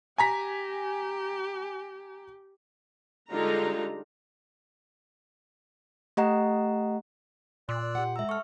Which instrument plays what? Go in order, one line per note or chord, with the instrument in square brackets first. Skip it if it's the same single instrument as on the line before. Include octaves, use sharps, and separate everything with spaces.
[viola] G4 [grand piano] G#5 A#5 B6
[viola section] D3 G3 G#3 D#4 F4 A#5
[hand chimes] A3 G4 D#5 F#5 A#5
[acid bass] A#2 [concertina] D5 E6 F#6 [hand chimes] C6
[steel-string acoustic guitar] G4 F#5
[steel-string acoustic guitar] G#2 G#3 [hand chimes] E5 E6 [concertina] A#5
[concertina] A4 [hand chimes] C#6 F6